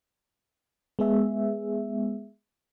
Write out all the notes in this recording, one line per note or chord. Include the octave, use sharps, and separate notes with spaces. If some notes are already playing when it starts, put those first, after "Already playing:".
G#3 B3 G#4 E5